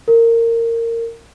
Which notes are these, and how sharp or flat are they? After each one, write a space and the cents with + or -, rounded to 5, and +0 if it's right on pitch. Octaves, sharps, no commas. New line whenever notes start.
A#4 -20